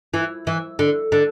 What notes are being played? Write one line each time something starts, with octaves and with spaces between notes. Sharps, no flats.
E3
E3
D3
D3